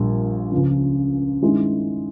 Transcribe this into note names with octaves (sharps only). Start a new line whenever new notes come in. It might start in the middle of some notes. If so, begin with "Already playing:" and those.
Already playing: A#1 A#2 G3
C#2 C#3 F3
G2 D#3 G#3 C#4 E4